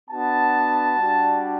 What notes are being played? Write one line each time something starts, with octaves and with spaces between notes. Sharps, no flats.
B3 D4 F#4 A5
G3 D4 F#4